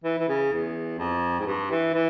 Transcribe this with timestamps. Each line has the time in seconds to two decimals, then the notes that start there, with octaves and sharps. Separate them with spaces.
0.04 E3
0.19 E3
0.28 C#3
0.53 E2
0.99 F2
1.39 G#2
1.46 G2
1.71 E3
1.93 E3